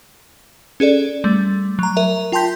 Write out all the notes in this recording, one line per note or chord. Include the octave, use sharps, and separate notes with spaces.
C#4 G#4 A4 D5
G3 A3
F#3 A#5
A#4 E5
F4 G5 A5 C6 G6 B6